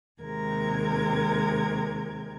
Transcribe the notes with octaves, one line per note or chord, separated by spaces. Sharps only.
D#2 C3 G#3 A#4 G#6